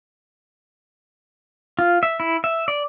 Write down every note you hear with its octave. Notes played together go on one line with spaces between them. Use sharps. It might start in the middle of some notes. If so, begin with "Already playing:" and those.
F4
E5
E4
E5
D5